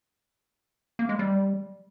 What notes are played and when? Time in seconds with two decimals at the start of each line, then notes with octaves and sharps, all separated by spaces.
0.99 A#3
1.09 G#3
1.19 G3